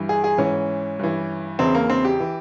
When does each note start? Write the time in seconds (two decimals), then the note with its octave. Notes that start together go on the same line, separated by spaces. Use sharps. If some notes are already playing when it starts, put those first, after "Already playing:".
Already playing: G2 E3
0.09 G#4
0.24 G#4
0.38 G#2 E3 C#4
0.99 G2 E3
1.59 E2 C#3 E3 C4
1.75 A#3
1.90 C4
2.05 G4
2.20 E3